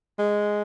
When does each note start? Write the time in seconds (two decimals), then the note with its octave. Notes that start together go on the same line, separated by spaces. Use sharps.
0.19 G#3